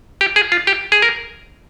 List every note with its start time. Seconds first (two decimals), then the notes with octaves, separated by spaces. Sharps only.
0.21 G4
0.36 G#4
0.52 F4
0.67 G4
0.92 G#4
1.02 A#4